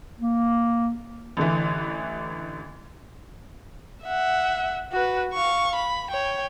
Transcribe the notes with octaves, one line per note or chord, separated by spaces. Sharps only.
A#3
A1 D3 E3
E5 F#5
F#4 B4
F5 C#6
B5
C#5 G5